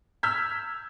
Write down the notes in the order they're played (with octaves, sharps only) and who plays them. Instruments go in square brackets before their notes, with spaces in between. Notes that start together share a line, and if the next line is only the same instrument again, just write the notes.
[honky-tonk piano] E6 F6 G6 G#6 B6